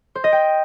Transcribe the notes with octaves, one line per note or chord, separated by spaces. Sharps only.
C5
D#5
G5